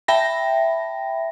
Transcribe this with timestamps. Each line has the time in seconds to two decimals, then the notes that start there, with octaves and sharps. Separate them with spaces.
0.08 E5 G5 A5 B5 A#6